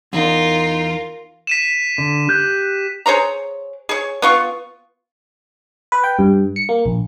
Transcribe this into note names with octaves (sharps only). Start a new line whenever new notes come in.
E2 D#4 F4 A#4
B6 D#7 E7
D3
G4 F#6 G6
G#4 C5 C#5 A#5
G#4 C#5
B3 F4 C#6
B4
G5
G2
C#7
A#3
A#1